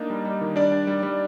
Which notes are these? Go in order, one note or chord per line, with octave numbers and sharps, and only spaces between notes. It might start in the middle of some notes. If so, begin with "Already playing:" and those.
Already playing: A#3 D4 D#4 D#5
G3
G3
D#3
G3 D4 D5
D4
G3
G3